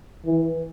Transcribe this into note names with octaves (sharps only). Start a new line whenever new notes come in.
E3